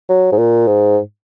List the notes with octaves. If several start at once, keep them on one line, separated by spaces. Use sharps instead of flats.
F#3
G#2
A#2
G#2